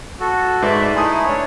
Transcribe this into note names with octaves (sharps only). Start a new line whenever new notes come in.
F#4 A4
G#2 A3 B4 D5 E5
A3 D#4 E4 G#5 C6 D#6
D4 C#5